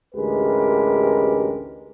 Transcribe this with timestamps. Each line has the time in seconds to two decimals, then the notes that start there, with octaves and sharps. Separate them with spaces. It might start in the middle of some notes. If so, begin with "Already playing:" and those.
0.15 A1 D2 G#3 G4 A#4 B4